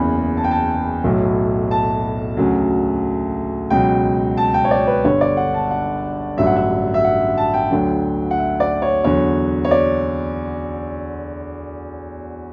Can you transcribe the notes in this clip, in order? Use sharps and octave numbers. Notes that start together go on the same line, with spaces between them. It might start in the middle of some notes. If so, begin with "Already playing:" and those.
Already playing: F#1 E2 C#3 E3 B5
A5
G5
A5
B1 A2 F#3
A5
D2 C#3 F#3
C#2 B2 F#3 G5
A5
G5
C#5
D5
B4
G1 G2 D3 C#5
D5
F#5
A5
F#5
A1 G2 D3 F#3 E5
F#5
E5
E5
F#5
A5
G5
D2 D3 F#3
F#5
E5
D5
C#5
E2 D3 F#3 C#5
C#5
D5